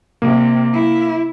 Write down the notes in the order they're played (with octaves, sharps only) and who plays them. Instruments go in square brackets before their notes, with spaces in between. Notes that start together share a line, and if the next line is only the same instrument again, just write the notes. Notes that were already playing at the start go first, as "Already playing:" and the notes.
[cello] C3 [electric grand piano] A#3
[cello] E4